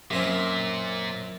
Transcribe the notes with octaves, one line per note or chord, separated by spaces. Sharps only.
F#2 A#2 C4 C#4